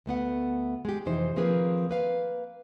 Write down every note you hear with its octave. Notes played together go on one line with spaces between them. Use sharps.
D2 A3 B3 F#5
G#3 G4
F2 C3 E3 D#4 C5
D#3 F3 A#3 C4 G#4 B4
A#3 B4 F5